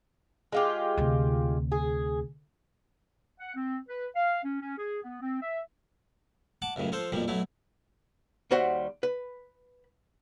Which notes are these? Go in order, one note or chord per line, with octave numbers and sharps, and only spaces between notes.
G#3 F4 G4
D2 C3
G#4
F#5
C4
B4
F5
C#4
C#4
G#4
B3
C4
E5
F#5 A5 D6
C#2 F#2 A2 C#3
F3 F4 A4 C5
B1 F2 A#2 F3 G3
B1 F#3 A3 E4
D#2 G3 F#4 C5 E5 F#5
B4